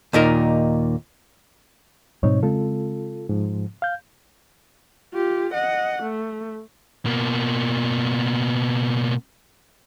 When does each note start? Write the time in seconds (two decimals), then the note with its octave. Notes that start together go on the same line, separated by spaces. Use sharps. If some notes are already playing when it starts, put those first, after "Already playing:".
0.13 D#2 A#2 D#4 A#4
2.23 G#2 B2 G3 C4 D#4 C#5
2.43 C#3 G#3 C4 F4 A4
3.29 G#2 F3
3.82 F5 G6
5.14 F4 G4
5.54 D#5 F#5
6.03 A3
7.06 B2 A#3